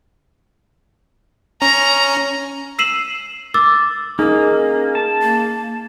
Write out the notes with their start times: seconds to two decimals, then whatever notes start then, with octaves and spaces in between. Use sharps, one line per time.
1.62 C#4 A#5
2.79 E6 B6 C7 D#7 E7 F#7
3.54 D6 E6 A6
4.19 A#3 C#4 D#4 G#4
4.95 A5
5.22 A#3